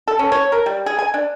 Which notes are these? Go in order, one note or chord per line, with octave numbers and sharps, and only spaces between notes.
A4
C#4
C#5
A#4
G3
G#4
G#5
D4